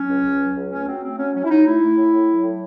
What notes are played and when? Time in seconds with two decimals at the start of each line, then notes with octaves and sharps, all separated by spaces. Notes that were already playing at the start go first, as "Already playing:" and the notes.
Already playing: F#3 C#4
0.09 C#2
0.25 C#2
0.40 F#3
0.56 C#2
0.72 A3 C#4
0.87 F#3 C4
1.03 A3 C4
1.19 F#3 C#4
1.34 F#3 C#4
1.45 E4
1.50 F#3 D#4
1.65 A3 E4
1.81 A3
1.97 A2
2.12 A2
2.28 F#3
2.43 A2